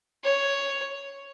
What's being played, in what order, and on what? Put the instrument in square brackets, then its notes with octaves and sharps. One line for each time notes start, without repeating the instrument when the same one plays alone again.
[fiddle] C#5